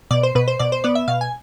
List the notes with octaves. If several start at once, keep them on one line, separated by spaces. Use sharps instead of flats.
B2 D5
C5
B2 B4
C5
B2 D5
C5
B3 D5
E5
B2 F5
G#5